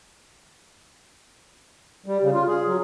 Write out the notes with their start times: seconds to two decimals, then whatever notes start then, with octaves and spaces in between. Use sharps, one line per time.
2.06 G3
2.23 C#3
2.34 F4
2.48 G#4
2.67 F#3